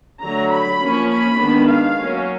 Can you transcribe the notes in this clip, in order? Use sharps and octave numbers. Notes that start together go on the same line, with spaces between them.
D3 F#3 A3 A#5
B5
F3 A#3 C#4
B5
D#3 G#3 B3 D4
F5
F#3 A#3 C#4